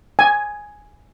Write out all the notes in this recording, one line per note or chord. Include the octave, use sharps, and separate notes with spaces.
G#5